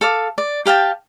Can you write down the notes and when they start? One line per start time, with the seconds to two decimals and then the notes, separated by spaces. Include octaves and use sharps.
0.01 A4 F5 D6
0.38 D5
0.66 G4 F5 G5 A5